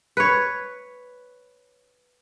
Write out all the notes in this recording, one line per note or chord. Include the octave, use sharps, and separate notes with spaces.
B4 C#5